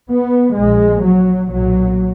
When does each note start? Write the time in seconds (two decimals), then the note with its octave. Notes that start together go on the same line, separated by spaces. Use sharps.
0.10 B3
0.57 A#1 A#2 G#3
1.04 F#3
1.51 B1 A#2 F#3